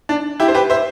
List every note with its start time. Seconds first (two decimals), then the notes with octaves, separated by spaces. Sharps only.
0.09 D4
0.40 E4 G4
0.48 C5
0.55 G4 B4
0.70 C5 E5